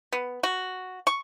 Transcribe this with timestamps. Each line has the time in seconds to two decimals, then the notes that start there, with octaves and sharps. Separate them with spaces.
0.12 B3
0.43 F#4
1.07 C#6